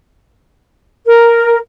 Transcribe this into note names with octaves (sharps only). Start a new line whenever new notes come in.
A#4